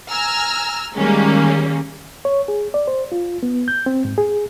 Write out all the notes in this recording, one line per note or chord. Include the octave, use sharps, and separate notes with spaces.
G#5 A#5 E6 F6
D#3 G3 G#3 A#3 C#4
C#5
G#4
D5
C5
F4
B3
G6
C4
G#2
G#4